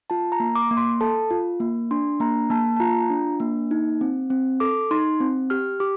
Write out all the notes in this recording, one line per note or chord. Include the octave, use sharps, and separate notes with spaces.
F4 A5
A#5
A#3
D6
A#3
C6
A4 A5
F4
A#3
D4 C6
A#3 A#5
A#3 A5
A5
F4 A#5
D4
A#3
D#4
C4
C4
A4 D6
D#4 C6
C4
G4 F6
G4 D6